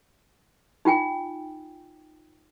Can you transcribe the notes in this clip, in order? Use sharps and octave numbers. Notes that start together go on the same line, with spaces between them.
D#4 F4 G5 G#5